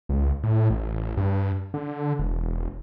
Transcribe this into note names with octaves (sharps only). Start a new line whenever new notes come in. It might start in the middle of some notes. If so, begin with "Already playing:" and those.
C#2
A2
A1
G2
D3
E1